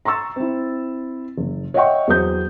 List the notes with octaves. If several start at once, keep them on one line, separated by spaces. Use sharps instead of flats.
A#5 C6 C#6 E6 A6
C4 E4
F#1
C#5 D#5 E5 F#5 G5 C#6
E2 F#3 C5 D#6 G6